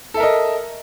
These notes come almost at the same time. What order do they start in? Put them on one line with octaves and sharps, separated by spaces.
A4 E5 A#4 D#5